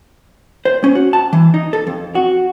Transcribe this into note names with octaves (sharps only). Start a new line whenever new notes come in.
C5
C#4
F#4
A5
E3
D#4
A4
F2
F#4